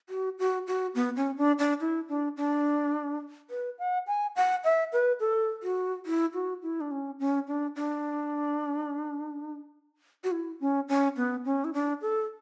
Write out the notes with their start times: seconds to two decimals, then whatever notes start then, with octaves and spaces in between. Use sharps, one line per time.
0.09 F#4
0.39 F#4
0.67 F#4
0.95 B3
1.16 C#4
1.37 D4
1.59 D4
1.81 E4
2.09 D4
2.37 D4
3.50 B4
3.79 F#5
4.07 G#5
4.36 F#5
4.64 E5
4.93 B4
5.20 A4
5.63 F#4
6.06 E4
6.34 F#4
6.63 E4
6.81 D4
6.91 C#4
7.20 C#4
7.47 D4
7.76 D4
10.24 F#4
10.32 E4
10.60 C#4
10.88 C#4
11.16 B3
11.45 C#4
11.65 E4
11.74 D4
12.02 A4